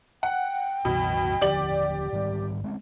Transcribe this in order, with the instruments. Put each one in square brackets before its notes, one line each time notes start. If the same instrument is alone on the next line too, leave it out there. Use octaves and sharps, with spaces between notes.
[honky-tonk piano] F#5 [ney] G5
[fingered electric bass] C2 F#2 E3 [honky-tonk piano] B2
[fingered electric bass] D#1 D3 F3 [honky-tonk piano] G4 D5 F#7
[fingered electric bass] G#2 D#3 G3
G#3 C4 C#4